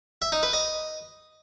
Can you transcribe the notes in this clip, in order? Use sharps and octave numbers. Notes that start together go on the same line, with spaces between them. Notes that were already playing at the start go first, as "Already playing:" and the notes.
E5
D#4
B4
D#5